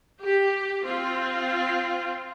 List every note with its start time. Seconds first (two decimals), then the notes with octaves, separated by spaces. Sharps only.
0.21 G4
0.82 C4 F4